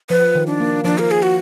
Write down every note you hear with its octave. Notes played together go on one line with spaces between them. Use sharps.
F3 B4
D#3
D4
A#3
F3 D4
A#4
G#4
F#4